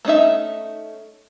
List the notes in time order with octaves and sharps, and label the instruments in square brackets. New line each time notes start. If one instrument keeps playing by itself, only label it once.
[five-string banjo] A3 C#4 D#4 E5